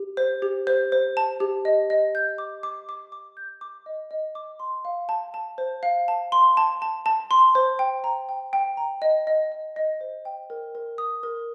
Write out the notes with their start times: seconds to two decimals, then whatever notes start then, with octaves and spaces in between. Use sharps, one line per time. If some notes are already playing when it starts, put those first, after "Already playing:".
Already playing: G4
0.17 C5
0.42 G4
0.67 C5
0.92 C5
1.17 A5
1.40 G4
1.65 D#5
1.90 D#5
2.15 G6
2.38 D6
2.63 D6
2.89 D6
3.12 D6
3.37 G6
3.61 D6
3.86 D#5
4.11 D#5
4.35 D6
4.60 C6
4.85 F5
5.09 A5
5.34 A5
5.58 C5
5.83 F5
6.08 A5
6.32 C6
6.57 A5
6.82 A5
7.06 A5
7.31 C6
7.55 C5
7.79 G5
8.04 A#5
8.29 G5
8.53 G5
8.77 A#5
9.02 D#5
9.27 D#5
9.52 D#5
9.76 D#5
10.01 C5
10.25 G5
10.50 A#4
10.75 A#4
10.98 D#6
11.23 A#4